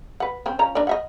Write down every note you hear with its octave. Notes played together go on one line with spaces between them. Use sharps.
B4 F#5
C4 C#4
F3 C#4 A#5
D4 A#4 D5
D#5 E5 F#5